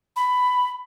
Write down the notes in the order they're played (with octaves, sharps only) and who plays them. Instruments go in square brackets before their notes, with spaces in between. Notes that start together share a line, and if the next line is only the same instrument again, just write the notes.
[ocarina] B5